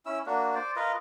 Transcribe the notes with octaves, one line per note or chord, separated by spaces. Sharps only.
C#4 E4 E6
A#3 D4 F#4
C5 D5
F4 A#4 B4 D#5